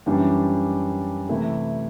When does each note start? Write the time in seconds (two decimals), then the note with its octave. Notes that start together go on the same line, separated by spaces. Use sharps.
0.06 F#2 E3 G3 D4
1.29 C3 E3 A3 E4